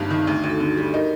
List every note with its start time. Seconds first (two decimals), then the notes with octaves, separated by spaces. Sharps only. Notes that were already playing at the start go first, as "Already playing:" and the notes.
Already playing: G1 G2 G3 A#3 D#4
0.10 D#3
0.27 D2 D#4
0.38 F#4
0.44 D2
0.49 A4
0.60 D3
0.77 G3
0.94 D#4 A#4